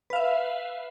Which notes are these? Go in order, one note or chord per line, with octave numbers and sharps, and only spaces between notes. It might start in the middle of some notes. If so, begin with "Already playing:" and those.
B4 E5 F5